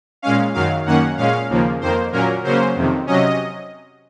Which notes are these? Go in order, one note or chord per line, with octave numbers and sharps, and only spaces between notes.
A#2 G#3 C#4 F5
F#2 D#3 F#3 F5
F#2 D#3 A#3 C#4 F#5
A#2 G#3 C#4 F5
D#2 C#3 F3 A#3
F2 D#3 A#3 C5
A#2 F#3 A#3 C#4 A#4
C#3 F#3 A#3 C#4 C5
F2 C3 D#3
C3 F#3 C#4 D#5